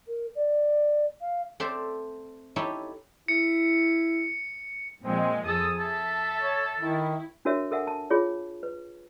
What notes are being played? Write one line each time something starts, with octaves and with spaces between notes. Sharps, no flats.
A#4
D5
F5
A3 C4 A4 C5 D5 E5
D#4 E4 G4 A4 C#5 E5
E4 C#7
A#2 F3 G#3 C4
F2 G#4 A4 D#6
A4 E5 A5
C#5
D#3 E4
D4 F#4 A#4 C#5 E5
A4 A#4 E5 F#5 G#5
A5
F4 G#4 C#5
B4